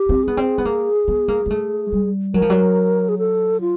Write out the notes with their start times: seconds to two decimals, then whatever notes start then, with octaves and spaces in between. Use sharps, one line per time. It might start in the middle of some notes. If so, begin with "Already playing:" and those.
Already playing: G4
0.09 C4
0.23 B3 G#4
0.37 C4
0.58 B3
0.65 A#3
1.08 B3
1.28 A#3
1.46 A#3
1.50 A3
1.92 G3
2.34 F#3 A#4
2.42 F3
2.50 F#3
3.09 G#4
3.19 A4
3.61 F4